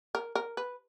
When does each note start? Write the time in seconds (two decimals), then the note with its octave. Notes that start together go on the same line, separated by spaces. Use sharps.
0.15 A#4
0.35 A#4
0.57 B4